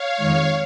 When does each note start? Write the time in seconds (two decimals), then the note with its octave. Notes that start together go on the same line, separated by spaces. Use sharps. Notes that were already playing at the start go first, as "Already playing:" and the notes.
Already playing: C#5 F5
0.17 F2 D#3 G#3